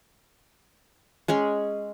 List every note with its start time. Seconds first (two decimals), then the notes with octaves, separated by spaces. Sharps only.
1.28 G#3 C#4 G#4